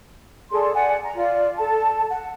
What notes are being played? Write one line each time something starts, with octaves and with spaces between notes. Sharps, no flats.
G#4 A4 D5 C6
D5 F#5 G#5
A#5
F4 D5
A4 A5
F#5